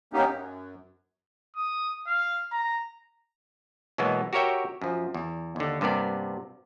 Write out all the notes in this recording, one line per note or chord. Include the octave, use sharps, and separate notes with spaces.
A#3 B3 C#4 D#4 G4
F#2
D#6
F5
A#5
B2 E3 F#3 G#3 A#3 B3
F#4 G4 A#4 C#5 E5 G5
F#2 F3
E2
D#2 D3
G2 C3 A#3 B3 D5